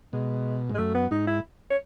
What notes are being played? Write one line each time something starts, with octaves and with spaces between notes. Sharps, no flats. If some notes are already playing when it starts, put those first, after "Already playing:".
B2 G#3
G#2
G#3
F#2 A3
B3
G#2 D#4
E4
C#5